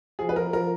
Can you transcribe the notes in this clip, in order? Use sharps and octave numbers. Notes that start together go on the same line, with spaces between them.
F3 G#4
B4
F3 A#4
F3 A#4